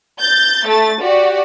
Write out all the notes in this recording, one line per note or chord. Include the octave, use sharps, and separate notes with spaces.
G6 A6
A3 A6
F#4 G4 D5